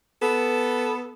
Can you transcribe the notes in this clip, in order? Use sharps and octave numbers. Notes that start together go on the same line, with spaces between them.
B3 A4